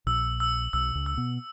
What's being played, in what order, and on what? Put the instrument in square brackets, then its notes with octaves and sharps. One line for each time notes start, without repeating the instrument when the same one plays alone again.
[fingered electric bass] A#1 A#2 [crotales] E6
[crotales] E6
[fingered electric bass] B1 B2 [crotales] E6
[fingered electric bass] C#2 C#3
[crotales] E6
[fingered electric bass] B2 B3